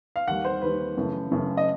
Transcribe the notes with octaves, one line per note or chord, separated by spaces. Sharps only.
F5
D#2 D#3 G3 F#5
C5
D#2 D#3 G3 B4
F#2 C#3 E3 A3
F#2 C#3 E3 A3
D#5